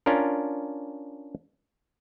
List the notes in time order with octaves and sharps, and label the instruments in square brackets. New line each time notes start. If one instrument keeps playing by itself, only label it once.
[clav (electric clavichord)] C#4 D4 F4 A#4